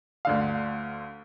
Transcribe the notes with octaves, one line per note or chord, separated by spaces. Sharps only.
D2 D3 F5